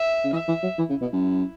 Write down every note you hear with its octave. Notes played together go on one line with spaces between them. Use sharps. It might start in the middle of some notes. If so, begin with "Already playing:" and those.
Already playing: E5
C#3
E3 E5
E3
F#3
E3 E4
C#3
B2
F#2